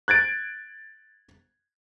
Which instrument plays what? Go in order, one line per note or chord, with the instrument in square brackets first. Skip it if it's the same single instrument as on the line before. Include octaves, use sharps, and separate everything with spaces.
[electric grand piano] F#6 G#6 A6 D7